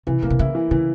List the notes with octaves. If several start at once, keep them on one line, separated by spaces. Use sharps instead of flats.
C3 E3
A#2 A#3
C3
C#3 E4
E3
C#3 E3